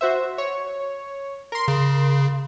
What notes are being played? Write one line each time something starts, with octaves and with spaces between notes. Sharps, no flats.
F#4 C5 E5
C#5
A#4 C6
C#3